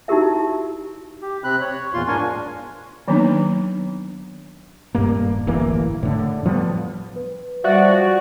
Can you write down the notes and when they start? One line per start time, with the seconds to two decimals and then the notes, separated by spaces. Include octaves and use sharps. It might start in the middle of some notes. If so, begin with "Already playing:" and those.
0.08 D#4 E4 F#4 G4 A#4 E5
1.22 G4
1.44 C3 C4 B5 F#6
1.61 C#5
1.94 E2 A#2 F4 C6
2.08 G#2 D4 A#4 G#5 C#6
3.08 D#3 F#3 A#3 B3 D4 D#4
4.95 D#1 G2 A#3
5.47 D1 A1 E3 A#3
6.03 A2 D3
6.46 F3 G3 B3
7.16 B4
7.64 F3 G3 F#4 D5 E5 F#5 C#6